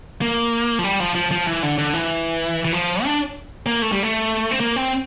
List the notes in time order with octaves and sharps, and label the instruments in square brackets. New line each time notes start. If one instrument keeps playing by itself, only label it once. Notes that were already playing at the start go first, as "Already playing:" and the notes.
[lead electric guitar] A#3
F3
G3
F3
F3
F3
E3
D3
D3
E3
E3
F3
D4
A#3
A3
G3
A3
C4
A#3
C4